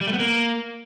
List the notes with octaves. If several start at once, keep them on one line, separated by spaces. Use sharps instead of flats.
G3
A3
B3
A#3